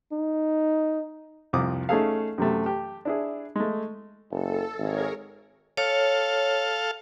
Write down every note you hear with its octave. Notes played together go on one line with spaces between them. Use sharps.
D#4
C2 F2 D6 D#6
A3 C#4 D#4 G#4 A4 F5
F#2 C3 A3
G4 A5
D4 E4 G#4
G#3 A3
F#1 A4
G#1 G#4 A#4 C#5
A4 C#5 F5